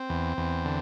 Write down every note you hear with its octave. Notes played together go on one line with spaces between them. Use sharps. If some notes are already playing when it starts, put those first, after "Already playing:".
Already playing: C4
E2
E2
D3